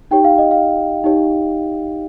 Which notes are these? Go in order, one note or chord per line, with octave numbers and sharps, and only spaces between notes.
D#4 G4 C#5 G5
F5
D#5
F5
D#4 G4 C#5